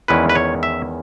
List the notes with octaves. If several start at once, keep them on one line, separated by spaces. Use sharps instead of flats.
E2 D#3 G#3 C#4 E4 B4
B4
C#5
E5